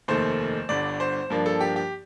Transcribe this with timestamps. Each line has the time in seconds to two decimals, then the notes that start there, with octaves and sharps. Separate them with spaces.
0.08 F1 D#2 D#3 A3 C5
0.69 G1 G2 D3 D5
1.00 C5
1.30 G2 F3 A#3 D4
1.46 A4
1.61 G4
1.76 G4